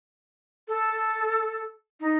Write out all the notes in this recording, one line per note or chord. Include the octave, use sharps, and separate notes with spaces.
A4
D#4